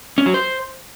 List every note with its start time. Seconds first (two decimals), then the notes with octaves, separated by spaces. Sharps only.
0.18 C#4
0.26 F#3
0.34 C5